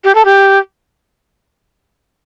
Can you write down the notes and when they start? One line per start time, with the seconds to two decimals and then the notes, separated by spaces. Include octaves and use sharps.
0.04 G4
0.15 A4
0.25 G4